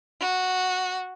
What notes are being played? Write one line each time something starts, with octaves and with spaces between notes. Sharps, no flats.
F#4